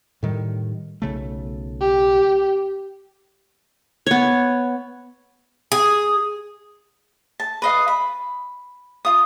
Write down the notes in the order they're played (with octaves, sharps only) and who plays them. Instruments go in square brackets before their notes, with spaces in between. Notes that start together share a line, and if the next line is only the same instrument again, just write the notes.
[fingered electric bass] A2 D#3 G3
B1 C#3 A3
[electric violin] G4
[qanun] B3 C#5
[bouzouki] G#4
[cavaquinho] A5
B4 D#5 F5
B5
F4 D#6